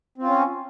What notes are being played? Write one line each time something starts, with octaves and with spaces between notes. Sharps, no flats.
C4 C#4 F4